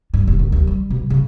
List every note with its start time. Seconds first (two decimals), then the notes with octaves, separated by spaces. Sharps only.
0.14 G2
0.27 F1
0.39 F#1
0.52 D#2
0.67 G3
0.90 B2
1.10 C#3